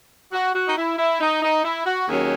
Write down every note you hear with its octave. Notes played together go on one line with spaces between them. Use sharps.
F#4
F#4
D#4
E4
E4
D#4
D#4
E4
F#4
D#2 D#3 F#3 C#4 G#4